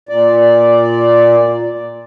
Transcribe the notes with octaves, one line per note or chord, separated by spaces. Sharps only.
A#2 D5